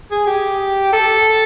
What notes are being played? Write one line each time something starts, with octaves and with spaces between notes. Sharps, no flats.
G#4
G4
A4